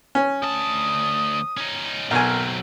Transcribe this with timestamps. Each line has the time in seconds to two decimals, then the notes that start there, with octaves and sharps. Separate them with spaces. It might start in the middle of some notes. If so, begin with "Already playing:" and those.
0.15 C#4
0.43 D2 A5 D#6
1.57 C#4 D#4
2.11 B1 F#3 C4 A#4 G#5